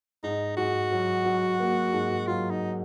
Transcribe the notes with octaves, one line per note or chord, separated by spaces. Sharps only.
G#2 D#4
G#2 F#4
F#3
F#3
A#3
G#2
F#3 F4
D#4